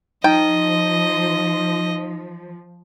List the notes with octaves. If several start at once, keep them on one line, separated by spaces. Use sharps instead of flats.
F3 D#4 D#5 G5